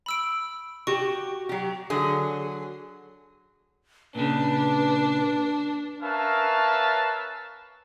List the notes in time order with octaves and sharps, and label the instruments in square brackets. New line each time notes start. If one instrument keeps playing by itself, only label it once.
[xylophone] B5 E6 D7
[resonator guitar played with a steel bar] F#4 G4 [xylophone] C#6
[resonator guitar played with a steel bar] F#3 G4
D3 F#3 G#4
[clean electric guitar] A#2 C#3 [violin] D4 [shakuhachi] B4
[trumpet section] C#4 A#4 B4 E5 F5 A5